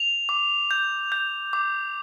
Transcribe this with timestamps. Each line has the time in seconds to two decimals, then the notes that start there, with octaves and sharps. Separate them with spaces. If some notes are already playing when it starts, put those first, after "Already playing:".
Already playing: F7
0.29 D6
0.71 G6
1.12 G6
1.53 D6